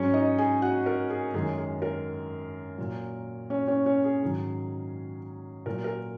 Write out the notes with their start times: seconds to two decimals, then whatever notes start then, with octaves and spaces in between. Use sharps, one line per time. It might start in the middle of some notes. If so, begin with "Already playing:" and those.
Already playing: G#2 F#3 C#4 C#5
0.14 D#4 D#5
0.38 G#4 G#5
0.62 F#4 F#5
0.86 A#4
1.10 G#4
1.34 F#2 D#3 G#3 G#4
1.58 G#4
1.82 A#4
2.78 A#2 F#3
3.50 C#4 C#5
3.68 C#4 C#5
3.86 C#4 C#5
4.04 G#4
4.22 G#2 D#3 F#3
5.66 A#2 F#3 A#4
5.84 A#4